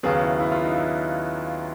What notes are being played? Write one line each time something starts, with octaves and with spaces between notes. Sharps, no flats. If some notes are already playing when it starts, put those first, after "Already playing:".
D#2 C#3 F#3 B3 G#4
E4
E4
F4
D#4
E4